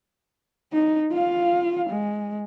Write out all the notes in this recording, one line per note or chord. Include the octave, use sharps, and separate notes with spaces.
D#4
F4 F5
G#3